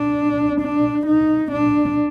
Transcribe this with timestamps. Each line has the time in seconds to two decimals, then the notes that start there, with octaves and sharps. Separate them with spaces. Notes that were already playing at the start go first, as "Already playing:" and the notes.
Already playing: D4
0.61 D4
1.06 D#4
1.52 D4